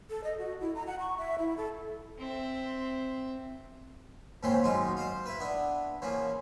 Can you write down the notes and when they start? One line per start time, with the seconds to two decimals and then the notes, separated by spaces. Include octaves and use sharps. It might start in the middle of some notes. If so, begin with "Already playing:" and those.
0.10 A4
0.24 D#5
0.38 F#4
0.61 E4
0.75 A#5
0.87 F#5
0.99 C#6
1.18 E5
1.39 E4
1.57 A4
2.19 C4 E5
4.43 D#2 G#2 C#3 E3 C4 C6
4.64 F#2 B2 G#3 D#4 F4
4.97 F4 C5
5.26 E4 B4
5.40 B3 D4 E4
6.02 C#3 E3 F3 A#3